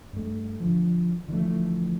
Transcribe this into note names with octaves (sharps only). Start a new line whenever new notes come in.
G2 A3
D3 F3
D3 E3 F3 A3